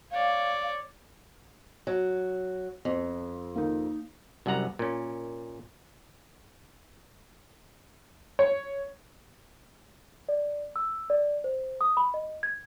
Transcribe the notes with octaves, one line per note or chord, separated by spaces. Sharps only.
C#5 D5 F5
F#3
F2
A#3 D#4
C2 F#2 C3 F#5 A#5
A#2 C#4
C#5
D5
E6
D5
C5
D#6
B5
D#5
G#6